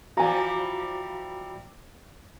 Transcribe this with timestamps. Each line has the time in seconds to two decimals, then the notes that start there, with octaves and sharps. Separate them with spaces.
0.17 E3 F3 G3 F#4 F5 G#5 A#5